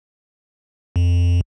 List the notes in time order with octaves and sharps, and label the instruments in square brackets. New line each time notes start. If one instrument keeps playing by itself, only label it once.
[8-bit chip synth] F2